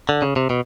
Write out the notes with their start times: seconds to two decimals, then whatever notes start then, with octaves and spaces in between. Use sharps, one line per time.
0.09 D3
0.22 C#3
0.36 C3
0.50 B2